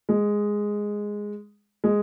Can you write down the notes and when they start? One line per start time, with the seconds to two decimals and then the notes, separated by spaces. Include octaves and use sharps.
0.09 G#3
1.84 G#3